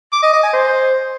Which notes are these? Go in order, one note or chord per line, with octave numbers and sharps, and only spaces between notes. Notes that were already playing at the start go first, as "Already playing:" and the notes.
D6
D#5
D#5
G#5
C5